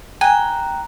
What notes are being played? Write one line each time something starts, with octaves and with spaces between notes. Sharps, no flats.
G5 G#5 A#5 F#6